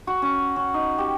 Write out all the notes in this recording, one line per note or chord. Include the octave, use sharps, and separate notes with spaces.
F#4
C#4
C#4
D#4
G4